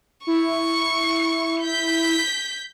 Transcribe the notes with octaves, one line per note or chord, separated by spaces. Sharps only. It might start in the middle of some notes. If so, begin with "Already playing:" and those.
E4 C#6 C#7
G6 B6